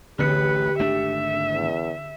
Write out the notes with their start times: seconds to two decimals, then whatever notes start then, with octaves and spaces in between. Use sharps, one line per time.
0.19 A1 D2 D3 G4 B4 C#7
0.79 G#1 A3 D4 E5
1.52 E2